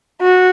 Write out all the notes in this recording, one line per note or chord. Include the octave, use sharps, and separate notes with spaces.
F#4